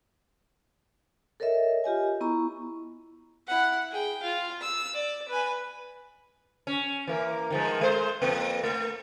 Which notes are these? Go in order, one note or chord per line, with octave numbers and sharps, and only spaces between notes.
A4 A#4 C#5 D#5 E5
F4 G4 D#5 G#5
B3 E4 A#5 C#6
E4 F#5
G#4 G5
F4 F5
E6
D5
B4 G#5
C#4
E3 A#3
D#3 F3 G#3
G#3 C5
F2 A#3
A3